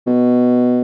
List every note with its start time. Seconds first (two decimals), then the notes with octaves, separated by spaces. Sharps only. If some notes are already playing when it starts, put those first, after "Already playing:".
0.07 B2